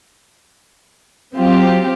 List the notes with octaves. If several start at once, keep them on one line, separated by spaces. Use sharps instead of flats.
F#3 C4 F4 G4